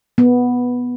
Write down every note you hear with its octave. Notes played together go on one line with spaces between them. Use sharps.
B3